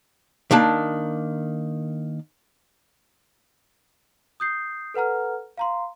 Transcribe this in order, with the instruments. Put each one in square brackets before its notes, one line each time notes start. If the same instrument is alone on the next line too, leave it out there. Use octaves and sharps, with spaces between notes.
[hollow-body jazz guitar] D#3 A#3 D4 A5
[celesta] D#6 G6 C7
A4 B4 F#5 A#5 F6
F5 A#5 C6